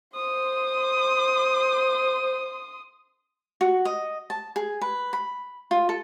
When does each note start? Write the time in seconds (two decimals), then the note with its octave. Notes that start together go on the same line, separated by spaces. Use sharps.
0.15 C5 C6 D#6
3.61 F#4
3.85 D#5
4.30 A5
4.56 G#4
4.81 B4
5.13 B5
5.71 F4
5.89 A4